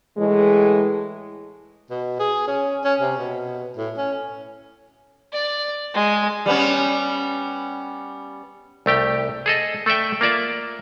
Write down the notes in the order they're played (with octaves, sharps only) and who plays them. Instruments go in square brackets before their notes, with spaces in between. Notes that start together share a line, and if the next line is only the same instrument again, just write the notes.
[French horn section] A2 E3 G#3
[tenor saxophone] B2
G#4
C#4
C#4
C3
B2
A2
C#4
[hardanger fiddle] D5
G#3
[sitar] G3 B3 C#4
[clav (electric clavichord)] C2 A3 G4 G5
G#4 A4 D#5
A3 A4 D5 E5 G5
A#3 F4 D5 E5